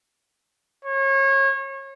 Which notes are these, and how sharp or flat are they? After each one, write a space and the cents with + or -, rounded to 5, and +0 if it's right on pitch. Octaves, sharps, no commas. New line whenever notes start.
C#5 -30